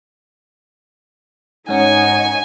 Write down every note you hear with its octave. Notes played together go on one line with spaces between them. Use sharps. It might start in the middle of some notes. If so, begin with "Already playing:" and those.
G#2 C#4 D#4 C#5 F#5 G#5